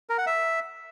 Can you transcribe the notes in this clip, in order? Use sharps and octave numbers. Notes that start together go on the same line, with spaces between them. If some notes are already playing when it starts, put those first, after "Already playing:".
A#4
F#5
E5